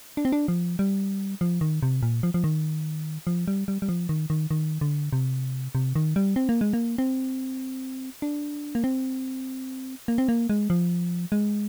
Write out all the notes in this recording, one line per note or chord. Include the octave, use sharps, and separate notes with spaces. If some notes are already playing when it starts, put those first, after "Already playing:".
D4
C4
D4
F3
G3
F3
D#3
C3
A#2
F3
F3
D#3
F3
G3
G3
G3
F3
D#3
D#3
D#3
D3
C3
C3
D#3
G3
C4
A#3
G#3
A#3
C4
D4
A#3
C4
A#3
C4
A#3
G#3
F3
G#3